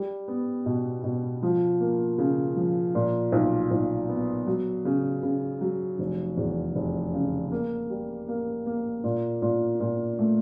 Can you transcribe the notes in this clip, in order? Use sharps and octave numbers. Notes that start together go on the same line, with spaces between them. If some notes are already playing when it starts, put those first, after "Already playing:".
Already playing: G3
B3
B2
B2
F3
A#3
C#3
F3
A#2
B1
B1
B3
F#3
C#3
C#3
F#3
F1
E2
F1
C#3
A#3
G3
A#3
A#3
A#2
A#2
A#2
A3